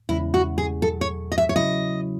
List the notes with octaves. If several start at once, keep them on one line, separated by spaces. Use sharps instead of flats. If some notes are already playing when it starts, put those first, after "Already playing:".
E2 C#3 G#3 C#4 E4
F#4
G#4
E2 B2 F#3 A4
C#5
D#5
E5
C#5
C#3 F#3 C#4 E4 D#5